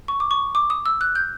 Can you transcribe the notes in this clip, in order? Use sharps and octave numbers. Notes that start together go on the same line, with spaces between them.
C#6
D6
C#6
D6
D#6
E6
F#6
G6